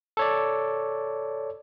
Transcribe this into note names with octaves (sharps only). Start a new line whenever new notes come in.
A4 C#5 D5